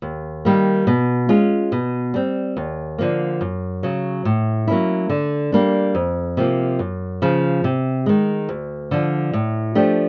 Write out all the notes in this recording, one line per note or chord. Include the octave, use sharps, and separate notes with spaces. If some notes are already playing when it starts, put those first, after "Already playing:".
D#2
D#3 G3 A#3
B2
G#3 C#4 F4
B2
G3 C4
D#2
D3 F3 A#3
F#2
C#3 F#3
A2
F#3 A#3 C#4 E4
D3
G3 A#3 D4
F2
C3 F3 A#3
F#2
C#3 F3
C3
D#3 G#3
D2
D3 F3
A2
F3 A3 D4 G4